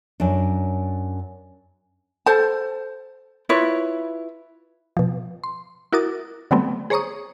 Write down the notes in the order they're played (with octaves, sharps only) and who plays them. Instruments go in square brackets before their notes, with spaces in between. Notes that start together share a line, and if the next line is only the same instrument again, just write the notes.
[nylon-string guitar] F#2 D4
[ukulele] A4 C5 A5
E4 F4 B4 C#5
[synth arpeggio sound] B2 F3
C6
E4 F#4 A#4 D6 D#6 A6
D3 F#3 G3 A3 B3 C4
G#4 C5 C#5 A#5 C#6 D#6